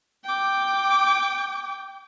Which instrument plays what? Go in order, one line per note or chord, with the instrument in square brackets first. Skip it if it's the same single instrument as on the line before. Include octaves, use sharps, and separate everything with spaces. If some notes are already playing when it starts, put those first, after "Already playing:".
[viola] G5 D6